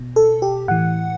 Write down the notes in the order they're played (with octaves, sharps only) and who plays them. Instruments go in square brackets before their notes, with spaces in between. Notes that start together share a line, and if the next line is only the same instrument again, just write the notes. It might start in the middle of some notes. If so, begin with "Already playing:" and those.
Already playing: [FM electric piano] B2
A4
G4
A2 E3 F#5